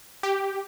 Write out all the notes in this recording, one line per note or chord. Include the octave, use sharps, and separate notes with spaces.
G4